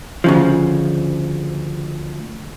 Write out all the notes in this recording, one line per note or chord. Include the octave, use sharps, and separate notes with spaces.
D2 C#3 F3